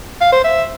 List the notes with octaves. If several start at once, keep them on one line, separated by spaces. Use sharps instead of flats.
F5
C5
E5